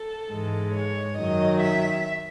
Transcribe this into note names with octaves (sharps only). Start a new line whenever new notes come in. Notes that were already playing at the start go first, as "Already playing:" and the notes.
Already playing: A4
G#2 E3 G#3
C#5
F#2 D#3 F#3 D#5
E5